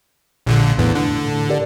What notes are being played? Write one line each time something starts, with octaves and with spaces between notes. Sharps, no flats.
A#1 A#2 D3
E2 A2
D3
G4 A#4 D5